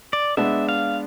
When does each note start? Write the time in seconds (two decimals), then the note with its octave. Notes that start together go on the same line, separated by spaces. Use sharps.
0.13 D5
0.37 G#3 B3 D4 E5
0.69 F5